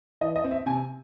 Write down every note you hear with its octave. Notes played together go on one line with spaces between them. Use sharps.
E3 D#5
D#5
C4
E5
C3 G#5